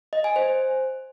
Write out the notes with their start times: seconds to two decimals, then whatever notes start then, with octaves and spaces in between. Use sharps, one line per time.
0.13 D#5
0.24 G#5
0.36 C5